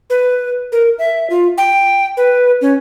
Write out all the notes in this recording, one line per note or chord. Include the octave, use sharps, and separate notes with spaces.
B4
A#4
E5
F4
G5
B4
C#4